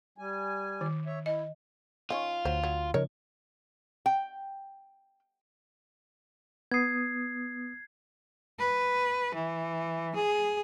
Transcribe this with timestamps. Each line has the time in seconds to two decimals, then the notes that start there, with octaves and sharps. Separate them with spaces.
0.18 G3 G#5
0.81 D#3
1.06 C#5 E5
1.26 E4 D#5
2.10 D#3 C#4 F4
2.45 D2 F#3 C5
2.64 F#3
2.94 C#3 F3 D#4 A#4 C#5
4.06 G5
6.72 B3 D#6 G#6 C7
8.59 B4
9.35 E3
10.15 G#4